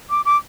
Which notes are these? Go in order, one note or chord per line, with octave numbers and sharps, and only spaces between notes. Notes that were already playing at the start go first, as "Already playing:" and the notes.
D6
D6